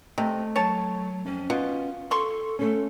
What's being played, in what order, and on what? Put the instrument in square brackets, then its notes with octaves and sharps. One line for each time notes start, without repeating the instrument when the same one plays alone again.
[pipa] C3 [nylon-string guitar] A3 D#5
[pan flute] F#3 [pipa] C#5 A5
[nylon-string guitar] F2 [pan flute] C#4
[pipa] B2 [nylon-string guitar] F4
[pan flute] A4 [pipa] C6 C#6
[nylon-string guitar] A3 C#4 [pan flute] A4